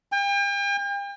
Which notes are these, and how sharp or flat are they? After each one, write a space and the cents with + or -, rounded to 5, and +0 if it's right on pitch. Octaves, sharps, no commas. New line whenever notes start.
G5 +40